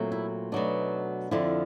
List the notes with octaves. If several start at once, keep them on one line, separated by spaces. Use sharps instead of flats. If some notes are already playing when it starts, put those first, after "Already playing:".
Already playing: A#2 F#3 A3 C4
E4
B2 F#3 A3 D4 D#4
F2 D3 F3 E4